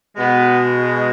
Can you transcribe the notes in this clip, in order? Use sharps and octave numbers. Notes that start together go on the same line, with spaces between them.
B2 G#3 B3